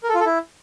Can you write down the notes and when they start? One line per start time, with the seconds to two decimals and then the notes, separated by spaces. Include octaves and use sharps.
0.03 A#4
0.09 A4
0.15 F4
0.20 A4
0.26 E4